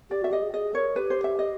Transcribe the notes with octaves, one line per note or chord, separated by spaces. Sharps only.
G4 D5
F#4 E5
G4 D#5
G#4
G#4 D#5
A#4 C#5
G4 B4
C5
E5
D#5